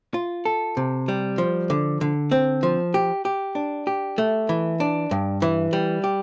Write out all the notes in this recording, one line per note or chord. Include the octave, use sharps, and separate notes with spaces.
F4
A4
C3
G3
F3
D3
D3
C4
F3
G4
G4
D4
G4
A3
E3
D4
G2
E3
G3
G4